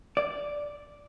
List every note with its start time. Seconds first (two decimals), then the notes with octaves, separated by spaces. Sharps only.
0.17 D5